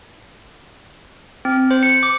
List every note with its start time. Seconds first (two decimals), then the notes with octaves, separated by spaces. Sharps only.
1.45 C4
1.71 C5
1.83 C#7
2.03 D6